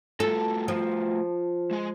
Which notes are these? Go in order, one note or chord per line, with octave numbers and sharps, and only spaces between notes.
A3 F4 F#4 A4
F3
G#3 D#5